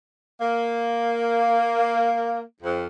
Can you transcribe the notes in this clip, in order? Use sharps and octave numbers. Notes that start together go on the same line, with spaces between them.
A#3
F2